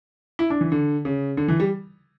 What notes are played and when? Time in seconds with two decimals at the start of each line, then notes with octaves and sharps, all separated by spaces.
0.39 E4
0.50 D4
0.61 E3
0.72 D3
1.05 C#3
1.37 D3
1.48 E3
1.60 G3